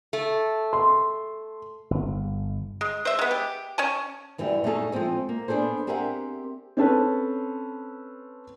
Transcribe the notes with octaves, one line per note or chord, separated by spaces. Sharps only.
A3
C6
G1
G#3
C5 E5
G#3 B3
G4
C#4 C#5 G#5 A5
F#2 E3 F#3 G3 A3
G3 A3 C#4 D#4 G#4 A4
F3 G#3 A3 C4 G#4
A#3
B3 D4 G#4 A4 C5
C4 G4 G#4 A#4 E5 F#5
C4 C#4 A4 B4